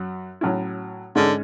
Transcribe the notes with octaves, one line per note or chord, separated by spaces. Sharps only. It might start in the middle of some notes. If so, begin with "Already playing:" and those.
Already playing: F#2 F#3
A2 F#3 C#4 E4
G#2 D3 G#3 C#4